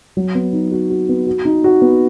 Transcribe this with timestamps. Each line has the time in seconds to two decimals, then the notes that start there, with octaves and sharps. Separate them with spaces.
0.17 F#3
0.35 B3
0.53 D#4
0.72 F#4
0.90 F#4
1.09 B3
1.26 F#4
1.45 D#4
1.64 F#4
1.82 B3